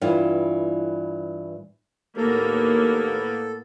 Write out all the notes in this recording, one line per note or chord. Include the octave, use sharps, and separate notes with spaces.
G2 E3 E4 F4
D#2 A2 A#3 B3 A4